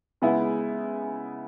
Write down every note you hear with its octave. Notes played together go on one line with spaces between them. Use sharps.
C#3 G#3 B3 E4 G#4